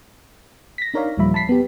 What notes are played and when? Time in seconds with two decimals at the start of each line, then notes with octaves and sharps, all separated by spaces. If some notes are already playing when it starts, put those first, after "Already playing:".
0.78 A#6 B6
0.94 D4 D#4 A#4 C#5 D5 F5
1.17 D#2 A#2 F3 G3 E5 B5
1.34 A5 B5 B6 C7
1.49 B3 G4